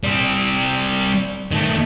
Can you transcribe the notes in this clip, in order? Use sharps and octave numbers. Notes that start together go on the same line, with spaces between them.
G3 C4
D#3 A3